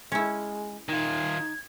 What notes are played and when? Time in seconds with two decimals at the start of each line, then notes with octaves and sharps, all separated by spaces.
0.12 G#3 C#4 E4
0.89 D#3 D#4 F4 G#6